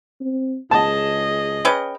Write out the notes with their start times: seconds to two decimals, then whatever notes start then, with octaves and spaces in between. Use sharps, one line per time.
0.21 C4
0.71 C#2 G#4 D#5 A5
1.65 C#4 B4 G5